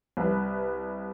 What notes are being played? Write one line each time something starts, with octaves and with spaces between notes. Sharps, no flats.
C2 B4